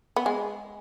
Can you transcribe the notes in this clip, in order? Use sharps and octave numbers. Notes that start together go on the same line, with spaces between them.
B3
G#3